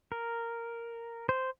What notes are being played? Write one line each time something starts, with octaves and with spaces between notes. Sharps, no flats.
A#4
C5